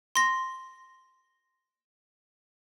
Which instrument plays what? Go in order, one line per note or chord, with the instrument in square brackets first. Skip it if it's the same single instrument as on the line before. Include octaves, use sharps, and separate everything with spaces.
[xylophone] C6 A#6